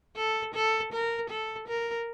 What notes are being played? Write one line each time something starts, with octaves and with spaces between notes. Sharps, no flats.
A4
A4
A#4
A4
A#4